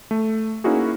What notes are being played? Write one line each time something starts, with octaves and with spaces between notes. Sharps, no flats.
A3
A#3 C#4 D#4 E4 F#4 G#4